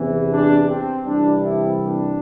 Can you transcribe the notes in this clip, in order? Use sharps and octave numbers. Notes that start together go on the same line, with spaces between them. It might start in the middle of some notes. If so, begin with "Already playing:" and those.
Already playing: E2 C3 E3
D4
C4
C2 C3 E3 G3 D4
C4 E4
D4